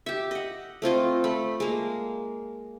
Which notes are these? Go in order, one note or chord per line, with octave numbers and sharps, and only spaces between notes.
G4 E5
D#5 F#5
A3 C4 F4 D#5
A3 B5
G#3 A#3